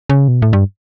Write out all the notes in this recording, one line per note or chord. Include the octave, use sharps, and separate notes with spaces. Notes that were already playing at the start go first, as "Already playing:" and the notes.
C#3
B2
A2
G2